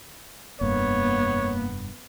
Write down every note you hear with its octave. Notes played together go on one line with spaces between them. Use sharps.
F1 G2 A#3 B3 C#5